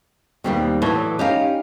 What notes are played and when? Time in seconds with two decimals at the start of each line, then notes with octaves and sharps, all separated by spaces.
0.44 D#2 B2 G3 C4
0.82 A2 E3 F#3
1.19 C#4 D#4 G4 D#5 F5